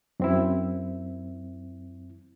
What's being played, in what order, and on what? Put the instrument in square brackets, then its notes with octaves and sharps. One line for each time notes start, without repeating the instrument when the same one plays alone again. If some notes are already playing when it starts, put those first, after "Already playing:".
[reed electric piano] F#2 C4 E4